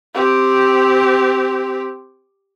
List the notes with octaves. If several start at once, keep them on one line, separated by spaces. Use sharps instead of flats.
C4 G4